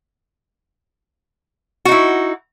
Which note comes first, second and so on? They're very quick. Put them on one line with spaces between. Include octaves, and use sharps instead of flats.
F#4 D#4 E4